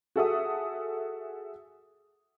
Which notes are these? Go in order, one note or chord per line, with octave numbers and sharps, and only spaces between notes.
F#4 G#4 A4 E5 F#5 D#6